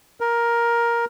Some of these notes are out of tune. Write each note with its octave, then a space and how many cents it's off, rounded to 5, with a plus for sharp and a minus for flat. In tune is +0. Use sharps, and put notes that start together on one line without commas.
A#4 +10